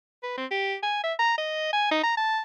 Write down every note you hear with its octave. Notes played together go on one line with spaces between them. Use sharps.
B4
C4
G4
G#5
E5
A#5
D#5
G#5
D#4
A#5
A5